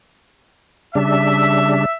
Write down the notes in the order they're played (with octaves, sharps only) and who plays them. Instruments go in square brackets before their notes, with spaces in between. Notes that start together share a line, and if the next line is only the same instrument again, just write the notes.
[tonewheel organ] C#3 G3 D4 [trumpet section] E5